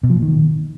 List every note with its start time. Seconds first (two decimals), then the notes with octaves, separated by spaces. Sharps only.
0.03 B2
0.10 F3
0.16 A#2
0.22 D#3